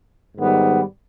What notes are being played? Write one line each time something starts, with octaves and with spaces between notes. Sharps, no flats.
G#2 D#3 G3 B3